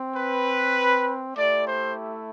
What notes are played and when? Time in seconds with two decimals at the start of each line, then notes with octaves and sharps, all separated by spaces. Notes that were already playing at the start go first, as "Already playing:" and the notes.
Already playing: C4
0.16 B4
1.35 A3 E4 G4 D5
1.65 C5